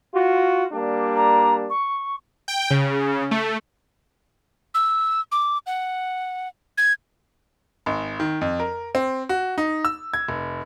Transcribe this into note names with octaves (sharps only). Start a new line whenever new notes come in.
F4 F#4
G3 A#3 D4
A#5
C#6
G5
C#3
A3
E6
D6
F#5
G#6
G#1
D#3
F2
A#4
C4
F#4
D#4
E6
G#6
F1